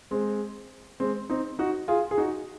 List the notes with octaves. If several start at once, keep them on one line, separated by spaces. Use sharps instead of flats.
G#3 C4
G#3 C4
C4 D#4
D#4 F#4
F4 G#4
G#4
D#4 F#4